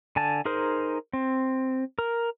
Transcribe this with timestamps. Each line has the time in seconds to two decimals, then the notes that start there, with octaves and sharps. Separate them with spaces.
0.16 D3 G#5 A5
0.45 D#4 G#4 A#4 C5
1.13 C4
1.99 A#4